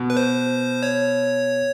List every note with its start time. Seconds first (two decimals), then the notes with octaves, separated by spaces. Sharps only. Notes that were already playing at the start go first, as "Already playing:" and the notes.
Already playing: B2
0.10 B4
0.17 C5
0.83 C#5